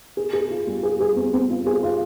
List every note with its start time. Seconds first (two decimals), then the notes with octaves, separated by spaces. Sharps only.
0.17 G#4
0.33 G#4
0.51 F4
0.67 G3
0.83 G#4
1.00 G#4
1.16 C4
1.33 C4
1.50 F4
1.66 G#4
1.83 F4